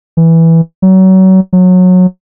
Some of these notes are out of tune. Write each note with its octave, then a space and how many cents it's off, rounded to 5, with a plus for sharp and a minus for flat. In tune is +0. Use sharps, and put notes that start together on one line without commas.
E3 -5
F#3 +30
F#3 -20